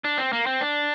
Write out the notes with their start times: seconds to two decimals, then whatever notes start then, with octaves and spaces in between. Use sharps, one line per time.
0.04 D4
0.18 C4
0.33 A#3
0.46 C4
0.61 D4